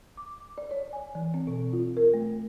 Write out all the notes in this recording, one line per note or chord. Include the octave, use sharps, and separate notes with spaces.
D6
D5
C#5
G#5
E3
C4
B2
F4
A#4
A3